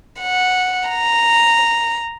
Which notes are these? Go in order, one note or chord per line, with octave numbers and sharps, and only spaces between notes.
F#5
A#5